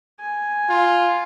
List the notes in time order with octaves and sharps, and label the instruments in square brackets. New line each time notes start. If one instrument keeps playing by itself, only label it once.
[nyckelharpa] G#5
[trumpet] F4